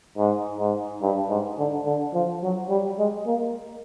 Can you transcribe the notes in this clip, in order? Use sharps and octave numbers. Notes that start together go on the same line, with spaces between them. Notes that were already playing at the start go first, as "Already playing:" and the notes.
G#2
G#2
G2
G#2
D3
D3
F3
F#3
G3
G#3
A#3